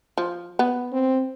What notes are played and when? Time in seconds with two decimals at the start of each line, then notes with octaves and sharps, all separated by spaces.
0.18 F3
0.59 B3
0.93 C4